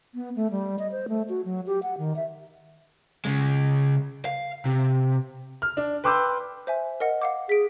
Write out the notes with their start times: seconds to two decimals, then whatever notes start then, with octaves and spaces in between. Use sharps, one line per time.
0.15 B3
0.36 A3
0.51 G3
0.79 D#5
0.92 C5
1.09 A3
1.29 F#4
1.45 F#3
1.67 G4
1.83 F#5
1.98 D#3
2.16 E5
3.25 C#3 G#3
4.25 F5
4.65 C3
5.62 F6
5.77 D4
6.04 B4 G5 C6 D6 E6 G6
6.67 C5 E5 G#5
7.00 A#4 D#5 F#5
7.22 F5 F#5 D6
7.49 G#4 B6 D7